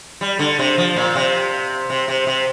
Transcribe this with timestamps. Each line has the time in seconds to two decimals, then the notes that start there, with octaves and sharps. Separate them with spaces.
0.21 G3
0.39 D3
0.59 C3
0.78 F3
0.96 A#2
1.15 C3
1.90 C3
2.08 C3
2.27 C3